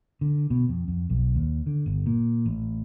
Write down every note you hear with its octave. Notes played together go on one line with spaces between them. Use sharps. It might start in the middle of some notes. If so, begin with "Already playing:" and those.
D3
B2
F2
F2
B1
D#2
D3
G1
A#2
A1